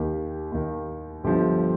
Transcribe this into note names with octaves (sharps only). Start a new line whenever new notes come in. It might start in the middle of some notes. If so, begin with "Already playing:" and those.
Already playing: D#2 D#3 G4
D#2 D#3
G1 G2 D3 F3 G4